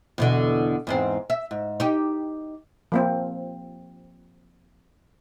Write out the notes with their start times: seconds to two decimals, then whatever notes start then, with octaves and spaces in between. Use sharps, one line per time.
0.18 E2 B2 D3
0.87 E2 G#2 C4
1.30 E5
1.51 G#2
1.80 D#4 G4
2.92 F3 A#3 C4